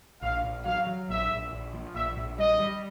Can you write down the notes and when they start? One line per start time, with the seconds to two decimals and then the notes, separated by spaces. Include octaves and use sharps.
0.22 A#1 F5
0.44 A#1
0.65 F#3 F5
0.87 F#3
1.08 A#1 E5
1.30 A#1
1.52 A#1
1.73 F3
1.95 A#1 E5
2.17 A#1
2.38 G3 D#5
2.60 G3